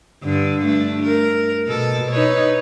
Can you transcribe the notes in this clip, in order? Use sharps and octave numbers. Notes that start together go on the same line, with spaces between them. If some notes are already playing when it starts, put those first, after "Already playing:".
G2 D3 D4
A3 D4
A#4
B2 A4
D#4 B4 C#5